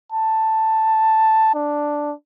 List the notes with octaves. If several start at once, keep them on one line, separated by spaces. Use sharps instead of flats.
A5
D4